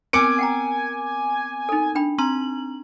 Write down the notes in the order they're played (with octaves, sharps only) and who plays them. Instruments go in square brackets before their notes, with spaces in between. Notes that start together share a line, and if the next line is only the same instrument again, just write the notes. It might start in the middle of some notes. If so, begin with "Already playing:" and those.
[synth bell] B3 C4 A#4 [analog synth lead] G#5 [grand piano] D6 C#7 D7
[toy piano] F#5 G5 A#5
D#4 A4
D4 G5 B5
[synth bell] C4 A#5 F#7 [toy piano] C6